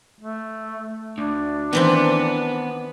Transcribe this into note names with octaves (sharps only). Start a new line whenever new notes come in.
A3
D2 D4
D#3 E3 B3 C4